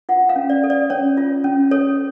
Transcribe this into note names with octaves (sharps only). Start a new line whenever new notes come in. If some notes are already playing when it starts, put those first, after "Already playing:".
F4 F#5
F5
C#4
D5
A4
D5
C#4 C#5
F4
C#4
A4 C#5